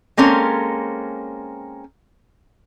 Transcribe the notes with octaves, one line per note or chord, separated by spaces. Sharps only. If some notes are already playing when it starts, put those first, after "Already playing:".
G#3 A#3 C4 C#4 A4